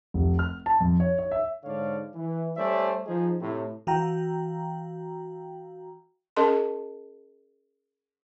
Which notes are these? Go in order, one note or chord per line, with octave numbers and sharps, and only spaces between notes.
F1
F6
A5
F2
C#5
C#5
E5
G#2 D3 C#5 D5 F5
E3
G3 A3 C#4 C5 D5 E5
F3 D#4 G#4
A2 C3
E3 F#4 F5 G5 A#5
C#4 G#4 A#4 D#5 A5 C6